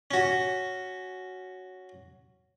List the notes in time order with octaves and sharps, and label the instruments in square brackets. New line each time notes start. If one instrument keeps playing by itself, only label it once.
[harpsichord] C#4 F#4